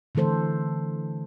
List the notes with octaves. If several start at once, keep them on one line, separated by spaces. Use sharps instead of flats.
D3 E3 A3 A4 C5